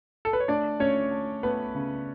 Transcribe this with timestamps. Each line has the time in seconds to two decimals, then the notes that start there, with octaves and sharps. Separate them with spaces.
0.25 A4
0.33 B4
0.40 C#5
0.48 A3 D4 D5
0.80 A3 C#4 C#5
1.11 A3
1.43 A3 B3 B4
1.75 C#3